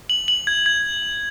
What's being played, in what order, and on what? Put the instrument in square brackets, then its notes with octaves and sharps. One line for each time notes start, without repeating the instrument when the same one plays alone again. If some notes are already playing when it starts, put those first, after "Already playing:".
[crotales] F#7
F#7
G#6
G#6